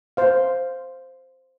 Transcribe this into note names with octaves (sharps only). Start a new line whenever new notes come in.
C5 F5